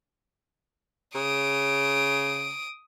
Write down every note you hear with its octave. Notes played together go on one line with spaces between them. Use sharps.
C#3 D#6 D7